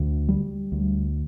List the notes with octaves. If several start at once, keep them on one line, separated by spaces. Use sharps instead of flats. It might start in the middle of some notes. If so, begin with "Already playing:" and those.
Already playing: D2
G3
D2